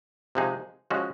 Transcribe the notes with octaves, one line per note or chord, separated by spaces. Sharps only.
C3 F3 G#3 D#4 G#4
F3 G#3 C#4 F#4